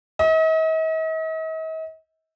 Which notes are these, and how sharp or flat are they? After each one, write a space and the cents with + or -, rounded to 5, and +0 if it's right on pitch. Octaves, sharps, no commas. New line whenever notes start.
D#5 +45